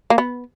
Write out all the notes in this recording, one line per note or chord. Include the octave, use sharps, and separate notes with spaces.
A#3
B3